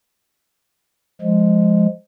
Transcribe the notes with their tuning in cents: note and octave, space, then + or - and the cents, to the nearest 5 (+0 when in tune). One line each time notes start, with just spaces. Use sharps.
F3 +0 G#3 +0